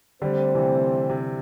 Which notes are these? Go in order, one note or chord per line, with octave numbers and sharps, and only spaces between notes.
D3 G3 A3 C4 G4 C5
C3 E3
C3